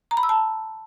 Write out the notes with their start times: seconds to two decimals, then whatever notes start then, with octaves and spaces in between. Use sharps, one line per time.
0.11 A#5
0.17 B5
0.23 E6
0.29 A5